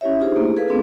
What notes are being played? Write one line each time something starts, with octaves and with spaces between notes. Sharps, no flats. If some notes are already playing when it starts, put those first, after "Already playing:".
C#4 E4 G4 C#5 E5
D4 D#4 F4 G4 G#4 C5
A3 A#3 E4
G#4 A4 B4 F5
A3 B3 C4 D4 F4 A4